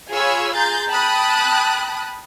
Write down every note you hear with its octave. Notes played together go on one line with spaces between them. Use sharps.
F4 G#4 C#5 G#5 B5 E6
G#4 A#5 C6 G6 A6
G5 A5 B5 D#6 F#6